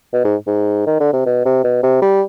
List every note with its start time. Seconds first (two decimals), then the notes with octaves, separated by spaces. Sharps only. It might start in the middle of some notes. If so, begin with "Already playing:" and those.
0.13 B2
0.24 G#2
0.47 G#2
0.87 D#3
1.00 D3
1.13 C3
1.26 B2
1.45 C3
1.64 B2
1.83 C3
2.02 G3